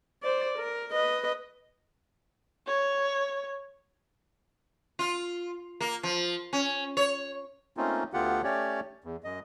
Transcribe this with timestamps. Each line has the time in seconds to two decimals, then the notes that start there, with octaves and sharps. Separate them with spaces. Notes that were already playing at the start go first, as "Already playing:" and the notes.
0.23 C5 D5
0.58 A#4
0.92 B4 D#5
2.67 C#5
4.99 F4
5.81 A#3
6.03 F3
6.53 C#4
6.97 C#5
7.77 A3 A#3 C4 C#4 D#4 F4
8.13 D2 D3 B3 F4 G4 F#5
8.44 A3 C#4 G4 C#5 D5
9.04 E2
9.24 F#2 D#5